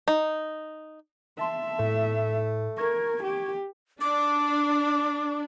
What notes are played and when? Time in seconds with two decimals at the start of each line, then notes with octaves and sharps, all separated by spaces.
0.08 D#4
1.39 E5 A5 C6
1.79 A2 A3
2.78 A#4 C#6 G#6
3.23 G4
4.01 D4 D6